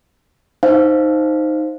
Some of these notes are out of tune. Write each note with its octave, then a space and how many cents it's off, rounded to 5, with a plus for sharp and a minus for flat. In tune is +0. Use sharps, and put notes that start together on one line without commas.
D#4 +0 C5 +0 F5 +0